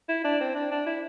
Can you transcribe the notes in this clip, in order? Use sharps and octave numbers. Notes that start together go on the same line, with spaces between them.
E4
D4
C4
D4
D4
E4